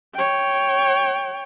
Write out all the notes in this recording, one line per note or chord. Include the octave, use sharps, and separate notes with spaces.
C#5 G5